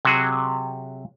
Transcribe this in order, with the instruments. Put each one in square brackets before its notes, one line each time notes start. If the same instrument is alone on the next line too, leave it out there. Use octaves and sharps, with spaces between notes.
[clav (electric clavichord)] C3 F#3 F#4 G#4